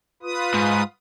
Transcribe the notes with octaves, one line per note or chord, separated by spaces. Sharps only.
F4 B4 D#6
G#2